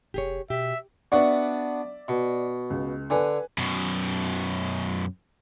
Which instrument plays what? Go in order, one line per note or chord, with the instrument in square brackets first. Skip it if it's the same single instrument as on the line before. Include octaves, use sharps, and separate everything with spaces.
[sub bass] F1 [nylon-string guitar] G4 G#4 C#5
[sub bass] B2 [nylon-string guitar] G4 [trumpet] E5
[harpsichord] B3 D4 F#4 [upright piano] D5 E5
[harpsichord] B2
[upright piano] C#2
[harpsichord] D3 [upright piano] B4 G#5
[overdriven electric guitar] F#2 B2